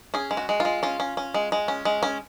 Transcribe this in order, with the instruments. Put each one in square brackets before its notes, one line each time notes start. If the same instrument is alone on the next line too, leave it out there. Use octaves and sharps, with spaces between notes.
[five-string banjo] C#4 G#4
G#3
F#4
G#3
F4
G#3
C#4 F4
C#4
C#4
G#3
G#3
C#4
G#3
C#4